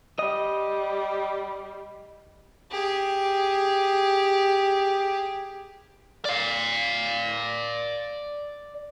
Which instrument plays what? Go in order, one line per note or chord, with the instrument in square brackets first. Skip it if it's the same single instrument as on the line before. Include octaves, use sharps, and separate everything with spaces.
[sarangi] G3 [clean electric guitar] D#5
[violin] G4 G#4
[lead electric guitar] D5 F5